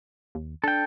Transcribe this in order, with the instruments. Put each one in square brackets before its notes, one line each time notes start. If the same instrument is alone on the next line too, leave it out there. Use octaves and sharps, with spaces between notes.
[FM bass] D#2
[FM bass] D4 [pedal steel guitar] A4 G5